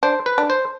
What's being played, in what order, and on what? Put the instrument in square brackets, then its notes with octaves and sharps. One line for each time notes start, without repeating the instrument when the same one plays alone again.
[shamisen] D4 [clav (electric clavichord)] C5
[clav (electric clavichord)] B4
[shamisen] D4
[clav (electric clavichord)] C5